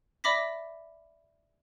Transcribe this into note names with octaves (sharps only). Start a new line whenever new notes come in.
D5 E5 B5 D6 A#6 B6